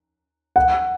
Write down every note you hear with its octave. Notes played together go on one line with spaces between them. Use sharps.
F#5